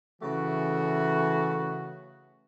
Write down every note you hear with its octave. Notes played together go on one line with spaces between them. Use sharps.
C#3 E3 A3 F#4